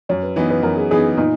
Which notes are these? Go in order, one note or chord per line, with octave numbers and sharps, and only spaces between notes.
F#2 C#5
B4
E3 B3 D#4 B4
B4
F#2 A#4
G#4
E3 B3 D#4 G#4
A#2 D#4